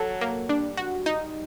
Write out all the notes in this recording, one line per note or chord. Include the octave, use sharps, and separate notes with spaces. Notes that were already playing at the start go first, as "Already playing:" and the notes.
Already playing: F#3 A4
A#3
G3 D4
F#4
D#4